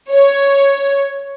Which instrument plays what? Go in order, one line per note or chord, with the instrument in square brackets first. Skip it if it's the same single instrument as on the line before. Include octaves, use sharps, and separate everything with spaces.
[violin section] C#5